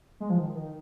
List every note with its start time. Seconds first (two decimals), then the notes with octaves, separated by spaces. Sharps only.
0.20 G#3
0.30 F3
0.38 D#3
0.55 D#3